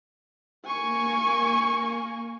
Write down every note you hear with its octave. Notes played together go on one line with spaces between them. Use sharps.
A#3 G#5 C#6